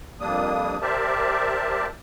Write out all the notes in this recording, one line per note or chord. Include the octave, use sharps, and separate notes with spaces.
F2 G3 A#3 D4 D#6
G4 A#4 C5 D5 E5 A5